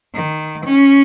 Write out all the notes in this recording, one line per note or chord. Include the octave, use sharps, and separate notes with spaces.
D#3
C#4